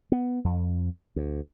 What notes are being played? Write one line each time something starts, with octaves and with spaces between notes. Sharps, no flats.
B3
F2
D2